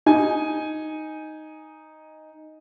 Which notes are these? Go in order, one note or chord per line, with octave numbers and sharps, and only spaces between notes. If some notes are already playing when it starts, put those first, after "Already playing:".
D#4 G#5